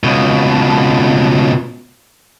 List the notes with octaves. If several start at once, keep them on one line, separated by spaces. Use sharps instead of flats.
C#2 B2